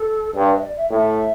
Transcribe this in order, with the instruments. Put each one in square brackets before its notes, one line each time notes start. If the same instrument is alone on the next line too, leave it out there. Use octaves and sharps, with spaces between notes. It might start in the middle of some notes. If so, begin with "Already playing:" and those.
Already playing: [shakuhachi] A4
[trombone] G2 [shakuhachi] D5
[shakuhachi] B4
E5
D5
E5
[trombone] A2 [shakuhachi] E5